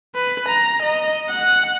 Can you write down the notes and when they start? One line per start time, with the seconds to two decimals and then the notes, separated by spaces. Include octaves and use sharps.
0.15 B4
0.48 A#5
0.82 D#5
1.30 F#5